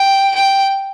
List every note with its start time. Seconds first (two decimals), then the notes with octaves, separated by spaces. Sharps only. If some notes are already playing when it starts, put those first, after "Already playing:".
Already playing: G5
0.36 G5